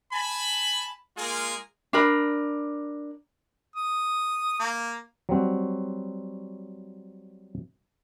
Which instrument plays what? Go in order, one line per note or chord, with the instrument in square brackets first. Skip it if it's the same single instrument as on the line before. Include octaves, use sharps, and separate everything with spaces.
[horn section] G#5 A5 B5
G#3 A#3 F4 G#4 A#4
[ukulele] D4 A#4 B5
[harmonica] D#6
A#3
[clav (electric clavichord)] F#3 G3 C4 F#4